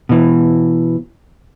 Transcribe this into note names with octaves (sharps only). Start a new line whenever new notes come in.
B2 E3